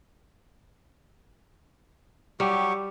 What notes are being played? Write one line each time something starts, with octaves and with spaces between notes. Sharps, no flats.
F#3 G3 G4 C#6